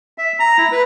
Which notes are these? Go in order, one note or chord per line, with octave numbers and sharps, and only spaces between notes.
E5
A#5
E4
B4